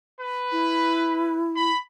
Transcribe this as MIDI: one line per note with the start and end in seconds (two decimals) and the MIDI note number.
0.21 1.37 71
0.52 1.70 64
1.56 1.77 83